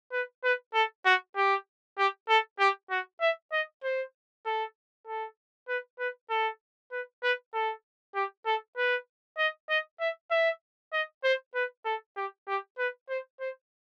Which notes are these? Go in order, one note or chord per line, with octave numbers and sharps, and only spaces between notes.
B4
B4
A4
F#4
G4
G4
A4
G4
F#4
E5
D#5
C5
A4
A4
B4
B4
A4
B4
B4
A4
G4
A4
B4
D#5
D#5
E5
E5
D#5
C5
B4
A4
G4
G4
B4
C5
C5